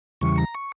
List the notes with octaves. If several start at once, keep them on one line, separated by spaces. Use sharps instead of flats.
E2 C#3 E3 G3 C#6
A#5
C#6